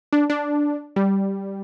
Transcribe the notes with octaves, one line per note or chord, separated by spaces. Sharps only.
D4
D4
G3